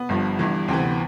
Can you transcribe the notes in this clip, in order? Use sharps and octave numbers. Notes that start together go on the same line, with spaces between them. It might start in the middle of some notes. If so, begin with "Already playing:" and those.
Already playing: B3
G1 G2 F3
G1 G2 E3
D2 C3 E3 C4
B3
C4